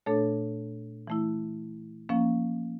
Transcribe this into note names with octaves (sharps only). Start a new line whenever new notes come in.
A#2 A3 D4 A4 C#5
E3 A3 E4
F3 A#3 C#4